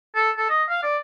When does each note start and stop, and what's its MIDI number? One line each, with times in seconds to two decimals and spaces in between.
0.15 0.30 69
0.37 0.48 69
0.49 0.63 75
0.69 0.80 77
0.83 0.97 74